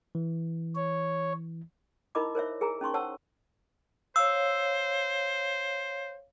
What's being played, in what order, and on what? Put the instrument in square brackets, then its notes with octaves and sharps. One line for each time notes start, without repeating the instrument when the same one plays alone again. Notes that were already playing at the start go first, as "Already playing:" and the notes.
[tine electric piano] E3
[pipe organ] C#5
[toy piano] D#4 E4 A#4 D#5 B5 D6
A#4 C5 C#5 E5
G#4 A#4 G#5 A#5
C#4 D#4 C6 C#6
C5 C#5 F#5 A5 E6
[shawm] C5 [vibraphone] C#5 F5 [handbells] E6